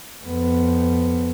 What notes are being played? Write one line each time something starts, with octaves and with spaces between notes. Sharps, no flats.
F2 B3